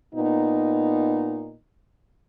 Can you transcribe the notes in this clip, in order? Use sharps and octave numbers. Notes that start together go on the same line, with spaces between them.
A#2 B3 D#4